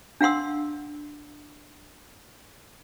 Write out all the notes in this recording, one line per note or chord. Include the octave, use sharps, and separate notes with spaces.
D4 F5 F#5 C6 E6